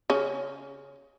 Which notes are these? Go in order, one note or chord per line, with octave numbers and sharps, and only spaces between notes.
C#3 C#4